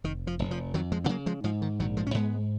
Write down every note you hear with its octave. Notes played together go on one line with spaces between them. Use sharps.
F1 D#3
F3
F1
F3
F2 D#3 F#3
F3 G#3
B3
C#3 F#3 A#3
F3 G#3
G#2 F3
D#3
A#1 D#3 F#3
F3 G#3
C#4
G#2 G#3 B3